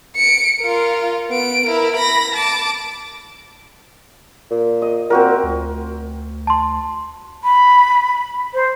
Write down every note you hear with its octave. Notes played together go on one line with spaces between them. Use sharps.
C#7 D7
F4 A#4
B3 D7
E4 A#4
B5 A#6
A5 D6
A#2
D#5
A#2 C4 F#4 A#4
D2
A5 C6
B5
C5